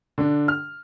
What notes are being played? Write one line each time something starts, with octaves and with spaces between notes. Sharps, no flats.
D3 D4
F6